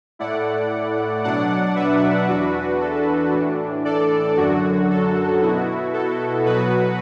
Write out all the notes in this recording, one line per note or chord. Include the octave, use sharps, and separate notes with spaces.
A2 A3 E4 D5 F#5
B2 F#3 D4 D5 F#5
B4 E5
E2 E3 D4 F#4 B4
A4
A2 E3 D4
A4 D5
F#2 D3 F#3 F#4
A4
B2 B3 E4 F#4
A4
B2 F#3 B3 F#4 B4